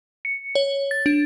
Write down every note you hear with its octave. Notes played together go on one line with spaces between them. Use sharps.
C#7
C#5
A6
D4